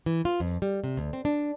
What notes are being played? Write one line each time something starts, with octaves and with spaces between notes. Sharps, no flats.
E3
F4
F2
G3
C3
D2
C4
D4